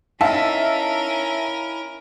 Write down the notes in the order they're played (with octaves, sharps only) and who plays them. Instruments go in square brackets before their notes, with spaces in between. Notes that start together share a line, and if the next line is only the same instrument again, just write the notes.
[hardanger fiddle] C#4 A#4 [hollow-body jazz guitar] D#4 E4 [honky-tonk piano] E5 F5 A5